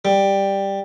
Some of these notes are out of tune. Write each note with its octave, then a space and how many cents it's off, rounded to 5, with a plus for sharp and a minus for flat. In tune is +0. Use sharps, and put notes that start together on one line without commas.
G3 +5